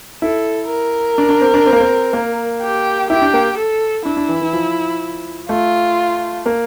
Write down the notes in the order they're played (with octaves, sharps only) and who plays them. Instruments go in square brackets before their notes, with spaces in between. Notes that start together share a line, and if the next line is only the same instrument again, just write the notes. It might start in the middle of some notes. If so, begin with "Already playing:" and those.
[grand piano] E4 [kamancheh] A4
[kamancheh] A#4
[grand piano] D4
D4
C4
D4
C4
A#3
C4
A#3
[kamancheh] G4
[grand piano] E4 [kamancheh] G4
[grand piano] D4
A#3
[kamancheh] A4
[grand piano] D4 [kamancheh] E4
[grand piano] D4
E3
E3
F3
[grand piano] A3 [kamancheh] F4
[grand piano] A#3